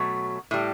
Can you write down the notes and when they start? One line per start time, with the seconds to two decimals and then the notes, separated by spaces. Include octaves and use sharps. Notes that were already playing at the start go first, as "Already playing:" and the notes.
Already playing: B2 F#3 A3
0.51 A2 G3